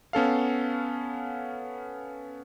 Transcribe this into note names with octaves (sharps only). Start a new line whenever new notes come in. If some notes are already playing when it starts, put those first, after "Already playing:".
B3 C#4 A4 F5